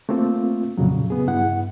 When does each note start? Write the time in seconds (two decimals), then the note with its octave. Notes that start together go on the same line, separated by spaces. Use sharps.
0.09 A3 A#3 C4 F4
0.77 F2 A#2 C#3 F#3
1.10 C#3 B3 G#4
1.27 G2 E4 F#5